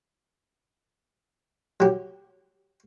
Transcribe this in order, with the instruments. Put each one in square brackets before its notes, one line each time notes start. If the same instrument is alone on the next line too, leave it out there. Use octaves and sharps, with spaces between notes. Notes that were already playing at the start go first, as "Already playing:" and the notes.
[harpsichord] F#3 G4